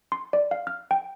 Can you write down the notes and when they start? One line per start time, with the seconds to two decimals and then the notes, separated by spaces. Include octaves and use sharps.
0.12 C6
0.33 D5
0.51 F5
0.67 F6
0.91 G5